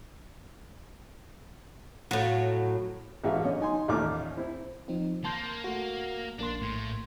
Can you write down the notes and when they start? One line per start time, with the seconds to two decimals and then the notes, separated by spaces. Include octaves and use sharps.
2.11 A2 F#3
3.24 A1 E3 G#3 F#4 E5 F5
3.44 F#2 D3 C#5 D#5
3.60 D#4 G#5 C6
3.88 A1 D#2 A#2 A3 D6 F6
4.37 C4 E4
4.88 F3 C4 D#4
5.24 A#3 A5 C6 G6
5.64 A3 F#4
6.39 A#1 A#3 D4 C6
6.62 A2